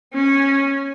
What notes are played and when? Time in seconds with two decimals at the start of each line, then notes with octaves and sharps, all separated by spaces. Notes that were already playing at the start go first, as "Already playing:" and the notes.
0.14 C#4